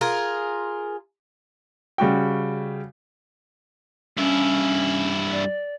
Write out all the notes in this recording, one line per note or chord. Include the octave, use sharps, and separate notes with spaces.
F4 G#4 A#4
C#3 G3 F#4 G5
G2 C#4 E4
D5